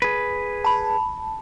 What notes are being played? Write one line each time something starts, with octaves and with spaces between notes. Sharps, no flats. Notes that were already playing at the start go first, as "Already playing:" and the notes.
G#4 B4
A5 B5